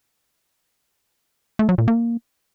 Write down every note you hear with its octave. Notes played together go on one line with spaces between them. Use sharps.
A3
F#3
A#2
A#3